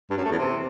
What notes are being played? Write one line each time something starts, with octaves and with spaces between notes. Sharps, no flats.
G2
F#2
A3
E2
C3